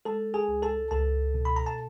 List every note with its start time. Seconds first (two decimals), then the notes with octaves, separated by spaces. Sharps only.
0.05 G#3 A4 A5
0.34 G#4 G#5
0.48 C#2
0.62 A4 A5
0.91 C#2 A4 A5
1.34 B2
1.45 B5
1.56 A#5
1.66 A5